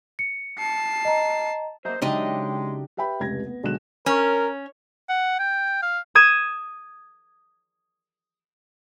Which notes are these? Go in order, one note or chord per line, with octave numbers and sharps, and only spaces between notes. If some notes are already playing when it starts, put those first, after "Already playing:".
C#7
A5 C7
D#5 A#5
F#3 A#3 C5 D#5 E5 A#5
C#3 F#3 G#3 D4 D#4 G4 D#5 G5
G4 B4 E5 G5 B5
F1 C#2 G4 G#6 A#6
B3
B1 D3 F#3 G#3 F#6 E7
C#4 A#4
F#5
G5
F5
D#6 G#6 D#7 E7